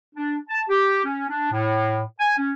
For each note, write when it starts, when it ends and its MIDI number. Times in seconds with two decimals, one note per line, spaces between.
0.15 0.36 62
0.49 0.62 81
0.69 1.02 67
1.05 1.25 61
1.29 1.52 62
1.52 2.01 45
2.20 2.36 80
2.38 2.52 61